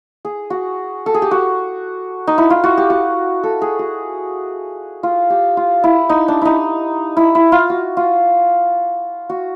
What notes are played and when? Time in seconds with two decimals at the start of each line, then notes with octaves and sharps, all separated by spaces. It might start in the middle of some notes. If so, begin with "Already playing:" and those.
0.25 G#4
0.50 F#4
1.06 A4
1.14 G#4
1.22 G4
1.31 F#4
2.27 D#4
2.38 E4
2.50 F4
2.64 F#4
2.78 G4
2.90 F#4
3.43 A4
3.62 G#4
3.79 F#4
5.03 F4
5.30 G4
5.57 F4
5.84 E4
6.09 D#4
6.28 D4
6.41 D#4 E4
7.17 E4
7.35 E4
7.52 F4
7.70 F#4
7.97 F4
9.29 F#4